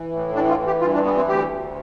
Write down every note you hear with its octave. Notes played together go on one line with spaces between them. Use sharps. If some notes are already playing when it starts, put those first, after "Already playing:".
Already playing: E3
A2
E3 D4
F4
E3
G4
G2 F4
D4
E3 B3
C4
D2 G4
D2